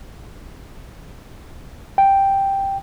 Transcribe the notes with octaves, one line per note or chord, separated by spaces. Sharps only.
G5